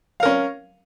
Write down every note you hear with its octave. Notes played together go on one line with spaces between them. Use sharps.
C#4 A#4 F5